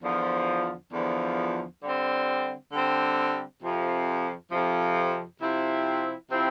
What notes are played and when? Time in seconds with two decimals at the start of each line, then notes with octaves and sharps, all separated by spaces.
0.02 E2 D3 F3
0.92 E2 D3 F3
1.82 D3 G3 C4
2.71 D3 G3 C4
3.61 F2 C3 F3
4.50 F2 C3 F3
5.41 C3 F3 C4 E4
6.30 C3 F3 C4 E4